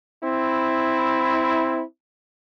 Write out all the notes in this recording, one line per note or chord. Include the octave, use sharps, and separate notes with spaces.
C4 E4